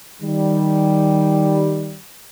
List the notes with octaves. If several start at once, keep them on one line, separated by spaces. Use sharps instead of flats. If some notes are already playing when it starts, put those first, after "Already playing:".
D#3 G3